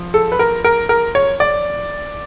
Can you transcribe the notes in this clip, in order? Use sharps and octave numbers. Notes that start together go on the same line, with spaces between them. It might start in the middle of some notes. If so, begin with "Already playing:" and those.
Already playing: F3
A4
B4
A#4
A#4
A#4
C#5
D5